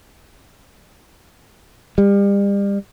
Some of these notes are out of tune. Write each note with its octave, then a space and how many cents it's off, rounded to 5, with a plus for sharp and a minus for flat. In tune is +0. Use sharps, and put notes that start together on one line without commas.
G3 +35